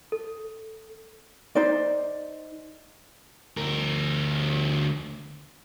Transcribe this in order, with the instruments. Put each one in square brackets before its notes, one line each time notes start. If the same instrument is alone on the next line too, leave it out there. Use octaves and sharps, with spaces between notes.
[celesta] A4
[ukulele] D#4 C5 D5
[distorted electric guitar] D2 A#4